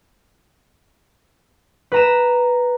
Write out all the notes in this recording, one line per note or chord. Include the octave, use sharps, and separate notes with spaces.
B4 A#5 E7